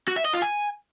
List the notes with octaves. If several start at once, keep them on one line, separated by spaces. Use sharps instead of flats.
F#4
E5
D#5
F4
G#5